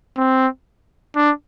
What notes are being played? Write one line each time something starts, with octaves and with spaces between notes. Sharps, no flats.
C4
D4